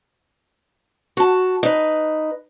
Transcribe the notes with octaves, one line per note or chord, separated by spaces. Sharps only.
F#4 A5
D#4 B4